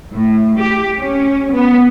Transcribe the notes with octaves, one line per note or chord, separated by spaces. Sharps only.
A2
G4
C#4
B3